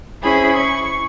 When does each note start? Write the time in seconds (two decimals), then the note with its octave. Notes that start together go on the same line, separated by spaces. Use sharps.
0.22 C#4 E4 G#4 C5 G#5 B5
0.56 C#6